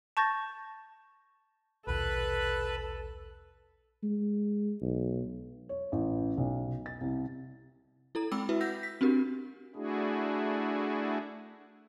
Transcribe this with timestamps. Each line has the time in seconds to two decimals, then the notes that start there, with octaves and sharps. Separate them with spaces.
0.17 A5 C#6 G6 A6 A#6
1.87 A#1 D#2 B2 A4 B4
4.03 G#3
4.82 B1
5.69 C#5
5.92 A1
6.37 B1
6.86 A6
7.01 C2
8.15 E4 A4 A#5
8.31 G#3 C4 G5 B5 D6 E6
8.49 E4 F#4 B4 E5
8.61 F#5 E6 G6 A#6
8.83 B6
9.01 C4 D4 F#4 G4 A#4
9.75 A3 D4 E4 F#4 G#4